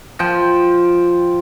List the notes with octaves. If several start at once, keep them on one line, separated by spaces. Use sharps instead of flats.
F3 G5